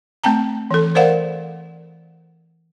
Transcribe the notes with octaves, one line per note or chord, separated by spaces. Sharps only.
A3 C4 G5 A5 A#5
E3 A4
A#4 C5 D5 F5 F#5